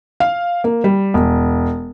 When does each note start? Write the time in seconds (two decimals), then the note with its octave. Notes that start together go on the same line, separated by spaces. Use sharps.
0.20 F5
0.64 A#3
0.84 G3
1.14 E1